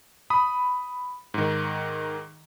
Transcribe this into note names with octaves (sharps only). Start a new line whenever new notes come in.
B5 D#6
G#2 D#3